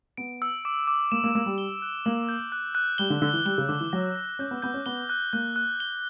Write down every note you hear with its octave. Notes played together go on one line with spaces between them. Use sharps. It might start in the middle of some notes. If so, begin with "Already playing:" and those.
B3 D7
E6
D6
D6
A#3 E7
A#3
A#3 D6
G3
G7
F#6
A#3 F#7
G6
F#6
F#6
G3 G7
D3
D3 E6
E3
G3 G7
C#3
D3 D6
E3
F#3 A#6
A#6
C#4 G6
B3
B3 G6
C#4
B3 G7
F#6
A#3 F#6
F#6
G7